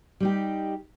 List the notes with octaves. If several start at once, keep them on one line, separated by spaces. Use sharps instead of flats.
G3 D#4 G4